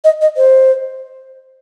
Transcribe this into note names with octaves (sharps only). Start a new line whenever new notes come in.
D#5
D#5
C5